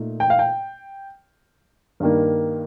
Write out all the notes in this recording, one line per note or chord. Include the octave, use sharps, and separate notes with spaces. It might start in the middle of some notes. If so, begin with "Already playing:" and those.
Already playing: A#2 A3 D#4
G5
F5
G5
G2 D#3 A#3